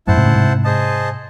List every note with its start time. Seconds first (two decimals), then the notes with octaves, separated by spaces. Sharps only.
0.07 F#2 A2 E4 C5 F#5 A5
0.17 G#2 C3
0.26 A2 C#3
0.35 G#2 C3
0.64 G#4 C5 D#5 A5